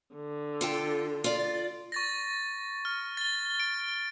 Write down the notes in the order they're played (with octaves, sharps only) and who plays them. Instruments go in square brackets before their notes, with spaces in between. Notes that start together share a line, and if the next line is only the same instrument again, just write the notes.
[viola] D3
[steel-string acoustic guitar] F4 A4 G5
F4 D5
[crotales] C#6 A6 A#6
F6
A6 G7
D7